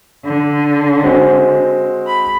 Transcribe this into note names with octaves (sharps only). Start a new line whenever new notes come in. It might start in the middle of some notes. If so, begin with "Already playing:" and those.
D3
G#3 C4 F#4
B5